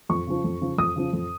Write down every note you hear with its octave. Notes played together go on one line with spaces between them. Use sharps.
F2 C#6
C#3 F3
F2
C#3 F3
F2 D#6
C#3 F3
F2